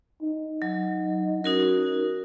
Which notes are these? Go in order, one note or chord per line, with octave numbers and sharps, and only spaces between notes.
D#4
F#3
C#4 D#4 F#4 A#4